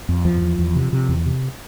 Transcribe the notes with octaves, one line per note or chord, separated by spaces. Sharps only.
F2
E2 F3
E2
E2
C3
C3
E2
C3